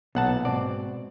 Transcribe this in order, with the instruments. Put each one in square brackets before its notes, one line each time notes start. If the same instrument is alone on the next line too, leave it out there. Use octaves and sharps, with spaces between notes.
[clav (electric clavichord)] B1 F#5 A5 [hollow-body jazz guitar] A#2 A#3 B3
[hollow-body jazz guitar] G#2 B2 C4 [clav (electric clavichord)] D5